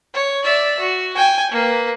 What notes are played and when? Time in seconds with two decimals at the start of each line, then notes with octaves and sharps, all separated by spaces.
0.14 C#5
0.44 D5 E5
0.79 F#4
1.17 G5 G#5
1.52 A#3 B4